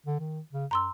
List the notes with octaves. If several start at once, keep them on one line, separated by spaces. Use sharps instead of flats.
D3
D#3
C#3
F#2 A#5 C6 E6